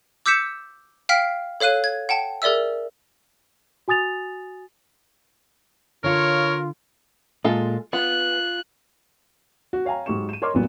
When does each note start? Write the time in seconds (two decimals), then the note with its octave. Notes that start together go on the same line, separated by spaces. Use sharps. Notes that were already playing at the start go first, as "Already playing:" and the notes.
0.26 D6 E6 G6 B6 C#7 E7
1.09 F5 G5 F6 B6 C7 D7
1.60 A4 C#5 F5 F#6 D#7
1.84 G#6
2.09 F#5 G5 A5
2.42 G#4 A#4 D5 E5 E6
3.88 F#4 G#5 D#6 A6 F7
6.04 D3 F4 A#4 C#5 F5
7.44 A#2 G#3 F4 A4
7.93 B3 F4 F#6
9.73 F#4
9.85 C#5 F5 G5 G#5 A#5
10.06 G#2 F#3 G4 C#6 E7
10.29 D#7 E7
10.42 A#4 C#5 D#5 C6 D6 F6
10.54 B1 G2 A#2 F#3 B3